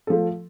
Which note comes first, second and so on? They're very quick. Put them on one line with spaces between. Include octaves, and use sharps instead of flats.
A4 F3 A3